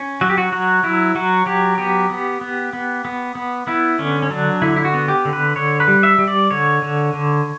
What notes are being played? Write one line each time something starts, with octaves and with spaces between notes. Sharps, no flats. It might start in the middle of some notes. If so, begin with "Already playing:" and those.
Already playing: C#4
F#3 F#4
G4
F#4
F#3 F#4
F#3 E4
F#3 F#4
F#3 G4
B3 G4
B3
B3
B3
B3
B3
B3 E4
D3 C#4
C#4
F#3 D4
D3 E4
E4
F#4
B3
G4
D3
B4
D3 C#5
B4
G3
E5
G3
D5
D3 C#5
D3
D3